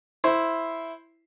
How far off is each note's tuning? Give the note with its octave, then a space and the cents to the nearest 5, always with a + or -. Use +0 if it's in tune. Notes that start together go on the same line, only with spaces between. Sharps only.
E4 +0 C5 +0